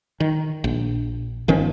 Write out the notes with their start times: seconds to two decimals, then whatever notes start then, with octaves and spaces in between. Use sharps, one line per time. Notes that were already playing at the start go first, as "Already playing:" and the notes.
0.20 D#3
0.64 A#1
1.48 G1 D#3 F3 C#4